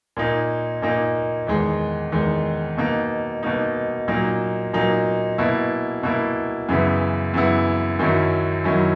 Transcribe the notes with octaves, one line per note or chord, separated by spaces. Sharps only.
A#2 A#3 D#4
A#2 A#3 D#4
E2 D#3 G#3
E2 D#3 G#3
B2 A#3 D#4
B2 A#3 D#4
A#2 F#3 A#3 D#4
A#2 F#3 A#3 D#4
B2 A#3 E4
B2 A#3 E4
F#2 C#3 E3 B3 E4
F#2 C#3 E3 B3 E4
F#2 D#3 F#3 C#4 E4
F#2 D#3 F#3 C#4 E4